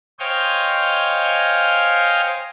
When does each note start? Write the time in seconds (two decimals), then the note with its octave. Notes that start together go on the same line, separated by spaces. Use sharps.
0.19 C5 C#5 D#5 F5 G5 G#5